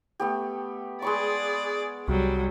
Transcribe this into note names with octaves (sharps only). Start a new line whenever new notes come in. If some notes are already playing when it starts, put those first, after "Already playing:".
A3 B3 G4
G#3 G#4 D5 B5 C#6
C2 F#3 G3